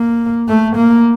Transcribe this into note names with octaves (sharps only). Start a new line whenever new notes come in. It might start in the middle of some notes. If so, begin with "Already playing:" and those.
Already playing: A#3
A3
A#3